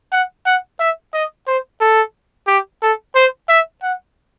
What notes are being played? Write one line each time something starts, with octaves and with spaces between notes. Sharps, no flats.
F#5
F#5
E5
D#5
C5
A4
G4
A4
C5
E5
F#5